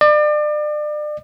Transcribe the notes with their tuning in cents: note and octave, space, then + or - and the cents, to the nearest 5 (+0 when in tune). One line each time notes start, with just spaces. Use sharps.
D5 +35